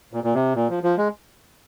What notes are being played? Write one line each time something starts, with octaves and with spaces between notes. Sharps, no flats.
A#2
A#2
C3
A#2
F3
F3
G#3